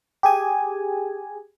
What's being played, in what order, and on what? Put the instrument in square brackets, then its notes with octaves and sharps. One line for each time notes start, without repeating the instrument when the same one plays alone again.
[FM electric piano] G4 G#4 G#5